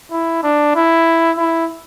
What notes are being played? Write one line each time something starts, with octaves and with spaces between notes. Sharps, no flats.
E4
D4
E4
E4